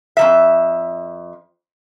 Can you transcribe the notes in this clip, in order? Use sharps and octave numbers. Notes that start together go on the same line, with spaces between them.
F2 G3 E5